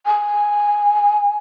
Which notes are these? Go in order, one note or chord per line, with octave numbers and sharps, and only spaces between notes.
G#5